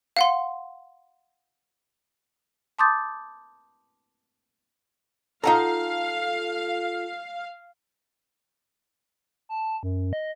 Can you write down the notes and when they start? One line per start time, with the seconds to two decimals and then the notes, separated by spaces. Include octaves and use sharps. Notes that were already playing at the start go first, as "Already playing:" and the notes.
0.17 F5 F#5 C6
2.79 A5 C6 D6 D#6 G6 A6
5.44 D#4 F4 A4 F5 F#5 A#5
9.49 A5
9.83 F#2
10.13 D#5